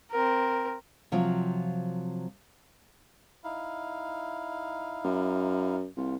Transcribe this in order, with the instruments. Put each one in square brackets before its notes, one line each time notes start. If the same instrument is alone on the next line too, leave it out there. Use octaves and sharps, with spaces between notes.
[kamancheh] C4 A#4
[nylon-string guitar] C3 F3 F#3 C4 F4
[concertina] D#4 E4 F5
[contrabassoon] F#2
[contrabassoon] C2 [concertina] F4